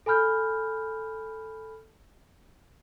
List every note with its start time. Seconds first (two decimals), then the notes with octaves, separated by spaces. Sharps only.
0.06 A4 G#5 B5 F6 G6